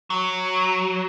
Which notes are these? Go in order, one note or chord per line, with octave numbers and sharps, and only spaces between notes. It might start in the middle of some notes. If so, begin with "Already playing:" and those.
F#3